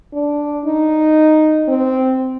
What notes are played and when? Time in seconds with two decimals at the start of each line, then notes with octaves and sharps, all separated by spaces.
0.13 D4
0.65 D#4
1.68 C4